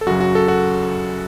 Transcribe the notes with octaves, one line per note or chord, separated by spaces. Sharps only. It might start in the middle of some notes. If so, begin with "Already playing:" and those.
A4
F#2 C#3 F#3 F#4
F#4
A4
F#4